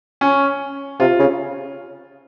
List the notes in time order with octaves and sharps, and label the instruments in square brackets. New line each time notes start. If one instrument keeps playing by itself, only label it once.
[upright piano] C#4
[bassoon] C3 [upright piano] F4
[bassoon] C#3